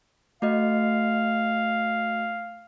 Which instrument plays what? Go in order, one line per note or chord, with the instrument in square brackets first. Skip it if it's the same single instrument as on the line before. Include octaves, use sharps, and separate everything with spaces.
[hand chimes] A3 F#4 D#5 [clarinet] F5